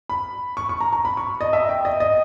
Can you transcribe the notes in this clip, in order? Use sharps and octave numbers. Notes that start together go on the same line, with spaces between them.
B5
C#6
C#6
A#5
A#5
B5
C#6
D#5
E5
G5
D#5
D#5